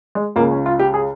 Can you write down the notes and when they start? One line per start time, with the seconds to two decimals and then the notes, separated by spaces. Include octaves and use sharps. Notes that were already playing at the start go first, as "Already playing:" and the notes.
0.15 G#3
0.36 C#2 C#3 A#3
0.51 C#4
0.66 F4
0.79 G4
0.94 G#4